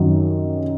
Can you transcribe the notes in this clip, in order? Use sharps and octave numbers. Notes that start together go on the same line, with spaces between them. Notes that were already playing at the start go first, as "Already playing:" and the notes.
Already playing: F#2 D#3 F#3